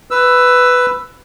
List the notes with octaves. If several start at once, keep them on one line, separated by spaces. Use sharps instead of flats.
B4 E6